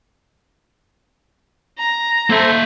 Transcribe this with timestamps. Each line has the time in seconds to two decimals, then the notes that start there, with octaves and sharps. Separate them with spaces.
1.78 A#5
2.30 A#3 A4 C5 E5